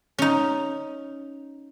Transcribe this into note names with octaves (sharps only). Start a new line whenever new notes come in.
C#4 D#4